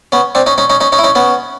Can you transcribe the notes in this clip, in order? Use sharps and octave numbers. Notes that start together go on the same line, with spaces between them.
B3 C#4
C4 D4
C#4 D#4
C#4 D#4
C#4 D#4
C#4 D#4
C#4 D#4
E4
C#4 D#4
B3 C#4